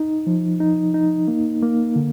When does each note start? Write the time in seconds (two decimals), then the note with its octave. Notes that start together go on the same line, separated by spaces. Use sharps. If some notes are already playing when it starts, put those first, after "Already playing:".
Already playing: D#4
0.27 F3
0.60 D#4
0.94 D#4
1.28 A#3
1.62 A#3
1.96 D3